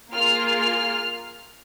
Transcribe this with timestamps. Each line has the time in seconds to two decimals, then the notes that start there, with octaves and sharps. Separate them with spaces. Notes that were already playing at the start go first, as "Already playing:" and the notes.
0.13 A#3 F4 G#4 F6
0.60 F6